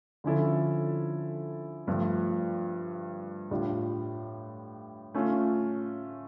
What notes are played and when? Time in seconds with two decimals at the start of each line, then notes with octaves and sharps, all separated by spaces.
0.24 D3 F3 C#4 E4 A4
1.87 G2 F3 A3
3.51 A2 G3 D4 F4
5.14 A3 C#4 F4